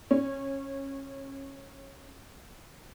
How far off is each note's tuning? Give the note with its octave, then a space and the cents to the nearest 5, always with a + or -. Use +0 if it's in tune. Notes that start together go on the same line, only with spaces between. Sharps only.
C#4 -20